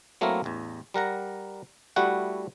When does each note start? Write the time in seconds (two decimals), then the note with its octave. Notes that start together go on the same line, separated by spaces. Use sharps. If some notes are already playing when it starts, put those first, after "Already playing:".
0.21 F#3 A3 A#3 C4 E4 A#4
0.44 A1 E2
0.94 G3 A#4 F#5 A#5
1.96 G3 A3 E4 F#4 F#5